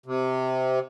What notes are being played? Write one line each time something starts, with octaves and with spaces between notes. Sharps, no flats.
C3